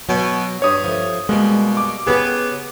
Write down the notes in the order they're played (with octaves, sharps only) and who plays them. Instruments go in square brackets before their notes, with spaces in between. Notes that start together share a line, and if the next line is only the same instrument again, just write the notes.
[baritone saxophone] B2 [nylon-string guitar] F#3 B3
[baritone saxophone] G2 [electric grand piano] C#5 D#6
[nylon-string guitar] F3 A3
[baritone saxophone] B2 [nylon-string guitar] G3 A#3 [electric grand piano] G#3
[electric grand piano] D6
[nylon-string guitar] C#3 G4 B4 [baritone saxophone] B3 [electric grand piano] G#4